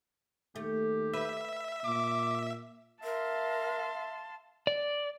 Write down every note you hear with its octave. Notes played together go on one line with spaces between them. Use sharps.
D#2 A3 G4
B4 E5
A#2 D6
A#4 E5 F5 A5 C6
D5